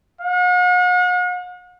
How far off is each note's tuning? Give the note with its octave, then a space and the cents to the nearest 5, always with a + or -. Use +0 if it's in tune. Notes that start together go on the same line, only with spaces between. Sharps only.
F#5 -45